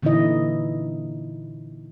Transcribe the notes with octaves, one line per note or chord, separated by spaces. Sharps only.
A#2 D3 E3 D#4 E4 D#5